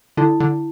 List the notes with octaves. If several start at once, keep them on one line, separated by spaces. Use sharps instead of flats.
D3 E4
D3